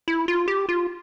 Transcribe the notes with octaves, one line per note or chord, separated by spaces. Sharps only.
E4
F4
G4
F4